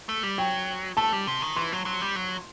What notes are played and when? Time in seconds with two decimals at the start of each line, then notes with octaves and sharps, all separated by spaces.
0.09 A3
0.23 G3
0.38 F#3 G5
0.97 A3 A5
1.13 G3
1.27 C3
1.42 D#3
1.56 E3 C6
1.72 F#3
1.86 F#3
2.01 G3
2.16 F#3